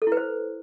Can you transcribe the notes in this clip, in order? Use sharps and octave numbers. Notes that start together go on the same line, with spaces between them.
A4
E4
B4
C5